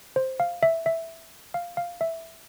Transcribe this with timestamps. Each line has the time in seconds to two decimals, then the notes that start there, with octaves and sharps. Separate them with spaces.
0.16 C5
0.40 F5
0.63 E5
0.86 E5
1.54 F5
1.77 F5
2.01 E5